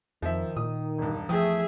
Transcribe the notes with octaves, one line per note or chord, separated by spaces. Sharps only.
F2 D#3 F3 E5
A#2 D#6
E1 G2
E2 F3 A3 G#4 E5 G5 D#6